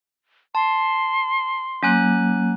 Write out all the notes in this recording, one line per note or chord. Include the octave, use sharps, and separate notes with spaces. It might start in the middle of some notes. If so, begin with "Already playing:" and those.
A5 C6
F#3 A#3 C#4 G#5 F#6